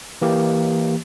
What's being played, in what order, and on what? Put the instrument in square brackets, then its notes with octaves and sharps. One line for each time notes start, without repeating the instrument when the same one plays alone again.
[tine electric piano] E3 A#3 G4